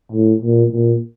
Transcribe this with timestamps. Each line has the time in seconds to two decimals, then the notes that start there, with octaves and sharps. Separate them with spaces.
0.12 A2
0.42 A#2
0.72 A#2